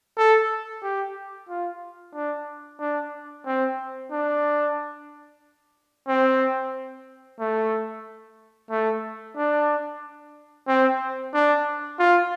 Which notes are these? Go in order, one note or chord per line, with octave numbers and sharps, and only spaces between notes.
A4
G4
F4
D4
D4
C4
D4
C4
A3
A3
D4
C4
D4
F4